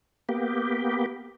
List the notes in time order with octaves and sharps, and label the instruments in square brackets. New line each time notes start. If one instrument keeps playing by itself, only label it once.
[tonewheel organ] A#3 B3 G4